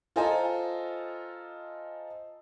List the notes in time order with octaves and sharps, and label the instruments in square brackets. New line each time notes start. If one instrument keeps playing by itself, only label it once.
[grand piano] F4 A4 C5 D#5 G#5 A#5